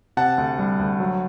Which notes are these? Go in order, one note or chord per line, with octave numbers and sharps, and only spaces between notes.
C3 F#5 A5
D2
G3
D2
F#3